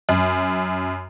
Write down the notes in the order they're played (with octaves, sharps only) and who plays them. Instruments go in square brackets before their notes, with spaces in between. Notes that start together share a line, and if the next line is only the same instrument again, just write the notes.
[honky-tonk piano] F#2